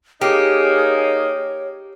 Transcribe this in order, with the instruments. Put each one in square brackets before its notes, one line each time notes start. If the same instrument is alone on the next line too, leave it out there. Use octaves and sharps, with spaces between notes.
[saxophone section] A#3 D#4 [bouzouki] G4 [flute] G#4 [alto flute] C#5